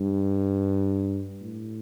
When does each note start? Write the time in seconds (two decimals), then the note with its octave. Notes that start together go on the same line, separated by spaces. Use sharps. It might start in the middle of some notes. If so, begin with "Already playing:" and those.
Already playing: G2
1.42 A2